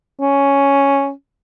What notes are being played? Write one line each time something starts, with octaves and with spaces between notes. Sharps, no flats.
C#4